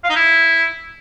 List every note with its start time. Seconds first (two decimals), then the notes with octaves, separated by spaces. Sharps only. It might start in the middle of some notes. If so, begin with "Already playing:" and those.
0.04 F5
0.10 D#4
0.16 E4